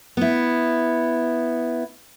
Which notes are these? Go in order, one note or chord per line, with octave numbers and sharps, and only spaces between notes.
B3 E4